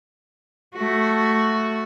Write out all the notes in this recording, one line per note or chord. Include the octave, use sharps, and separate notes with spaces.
A3 F#4